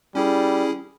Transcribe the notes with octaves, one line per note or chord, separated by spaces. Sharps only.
G3 C#4 E4 G#4